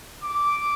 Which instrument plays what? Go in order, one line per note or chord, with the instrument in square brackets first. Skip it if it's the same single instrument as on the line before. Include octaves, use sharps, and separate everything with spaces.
[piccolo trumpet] D6